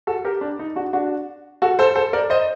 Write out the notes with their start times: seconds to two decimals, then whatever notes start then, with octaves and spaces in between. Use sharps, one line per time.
0.07 F#4 A4
0.25 G4 A#4
0.41 D4
0.59 D#4
0.76 D4 F#4
0.93 D4 F#4
1.62 F#4 A4
1.79 A4 C5
1.95 A4 C5
2.13 A#4 D5
2.30 C5 D#5